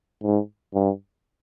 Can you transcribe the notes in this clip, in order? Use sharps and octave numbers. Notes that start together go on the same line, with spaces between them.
G#2
G2